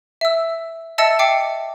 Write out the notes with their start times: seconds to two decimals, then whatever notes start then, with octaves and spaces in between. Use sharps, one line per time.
0.21 E5 E6
0.98 D#5 E5 A5 E6 A6 C#7
1.19 E5 G5 D6 C7 C#7